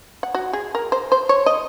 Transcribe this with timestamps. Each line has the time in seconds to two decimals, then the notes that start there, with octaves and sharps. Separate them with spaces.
0.23 F#5
0.34 F#4
0.53 G#4
0.75 A#4
0.92 C5
1.12 C5
1.29 C#5
1.46 D#5